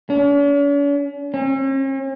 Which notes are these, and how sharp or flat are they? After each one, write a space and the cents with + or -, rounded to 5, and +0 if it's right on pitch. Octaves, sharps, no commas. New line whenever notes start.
C#4 +45
C#4 -45